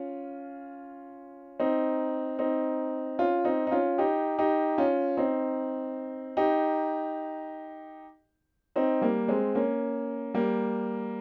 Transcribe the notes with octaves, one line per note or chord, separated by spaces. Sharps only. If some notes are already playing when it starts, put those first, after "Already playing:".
Already playing: C#4 F4
C4 D#4
C4 D#4
C#4 F4
C4 D#4
D#4
C#4 F4
D#4 G4
D#4 G4
C#4 F4
C4 D#4
D#4 G4
C4 D#4
G3 A#3
G#3 C4
A#3 C#4
G3 A#3